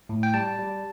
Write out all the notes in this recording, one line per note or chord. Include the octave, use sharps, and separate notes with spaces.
A2
G5
G3 A5
G3